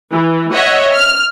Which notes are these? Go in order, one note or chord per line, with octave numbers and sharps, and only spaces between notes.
E3
C#5 D#5 E5 F#5
F6